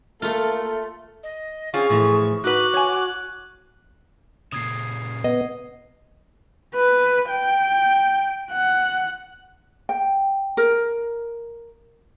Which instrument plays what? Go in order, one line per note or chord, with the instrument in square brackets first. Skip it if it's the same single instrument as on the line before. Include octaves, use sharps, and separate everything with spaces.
[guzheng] A3 F4 [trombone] A#3 [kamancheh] A4
[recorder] D#5
[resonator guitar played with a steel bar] C4 C#4 F4 [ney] G#4 [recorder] C#6
[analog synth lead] A2 [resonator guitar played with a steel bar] E3 F3
[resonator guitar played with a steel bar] D#4 B4 [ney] F#4 [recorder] D6 [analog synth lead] F#6
[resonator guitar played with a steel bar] C#5 G#5
[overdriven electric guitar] A#2 C#3 [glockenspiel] D#6 G#6 C7
[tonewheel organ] B3 [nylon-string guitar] D#5
[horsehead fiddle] B4
G5
F#5
[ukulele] G5
A#4